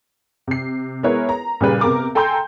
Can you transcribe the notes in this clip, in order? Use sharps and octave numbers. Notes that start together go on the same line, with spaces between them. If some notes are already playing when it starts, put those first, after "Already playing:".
C3 C7
G#3 B3 E4 A#4 B4 C#5
A#5
A#2 C#3 G3 G#4 B4
C3 B3 A#4 D6
A4 G5 G#5 A#5 C6 G6